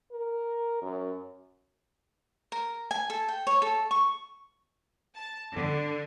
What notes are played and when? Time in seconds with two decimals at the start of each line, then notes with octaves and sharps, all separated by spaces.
0.12 A#4
0.82 F#2
2.52 A#4
2.91 G#5
3.10 A4
3.28 G5
3.47 C#5
3.62 A4
3.91 C#6
5.16 A5
5.53 D3